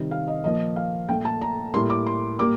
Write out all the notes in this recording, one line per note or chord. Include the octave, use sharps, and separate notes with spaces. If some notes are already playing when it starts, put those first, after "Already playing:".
Already playing: C3 D#3 G3
F5
D#5
A#2 F3 A#3 D#5
F5
A#2 A3 G5
A5
A#5
A2 G3 A#3 C6
D6
C6
A#2 G3 A#3 D6